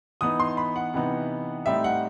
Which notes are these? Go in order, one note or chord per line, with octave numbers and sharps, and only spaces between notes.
E3 B3 D#4 D#6
C6
B5
F#5
C3 E3 B3 D#4
A2 G3 C4 D#4 E5
F#5